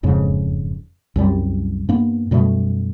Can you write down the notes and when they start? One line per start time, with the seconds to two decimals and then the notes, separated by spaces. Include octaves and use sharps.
0.03 E1 F2 G#2 C#3
1.16 C2 F#2 G3
1.89 G2 A#3 B3
2.31 F#2 B2 G3 A3